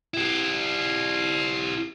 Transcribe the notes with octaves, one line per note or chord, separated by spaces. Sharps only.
E4 G4